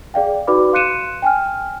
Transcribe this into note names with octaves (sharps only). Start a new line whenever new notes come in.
G#4 D5 F5 G5
D#4 F#4 B4 D5 B5 D6
F5 C6 F#6 C#7 D#7 E7
G5 G#5 F6